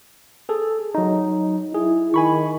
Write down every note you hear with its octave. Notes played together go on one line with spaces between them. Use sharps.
G#4 A4
F#3 D#4
E4 G#4
D#3 G#5 B5 C#6